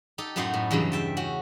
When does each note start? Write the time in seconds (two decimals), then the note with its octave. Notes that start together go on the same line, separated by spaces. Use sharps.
0.18 D#4 G4 A4
0.36 F#2 A2 A3 D#4 F#4 C6
0.54 A2
0.71 E2 G2 C#3 F#3
0.92 E5 G5 A5
1.17 C#4 F#4